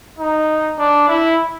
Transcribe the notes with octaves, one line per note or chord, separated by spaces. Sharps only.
D#4
D4
E4